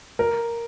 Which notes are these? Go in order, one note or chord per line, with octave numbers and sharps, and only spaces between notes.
A#4